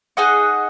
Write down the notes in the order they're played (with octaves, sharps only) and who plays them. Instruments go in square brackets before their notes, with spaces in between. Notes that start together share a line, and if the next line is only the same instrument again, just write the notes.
[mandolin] D#4 G#4 D#5 F#5